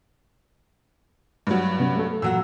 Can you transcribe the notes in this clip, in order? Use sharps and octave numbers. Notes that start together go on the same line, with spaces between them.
G2 F#3
C3 B3 C#4
A3 A4
A#2 F#3 F#5 E6